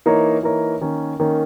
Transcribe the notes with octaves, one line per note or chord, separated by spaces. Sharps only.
E3 A#3 D#4 A#4 C#5
E3 A#3 D#4 A#4 C#5
D#3 A#3 C#4
D#3 A#3 C#4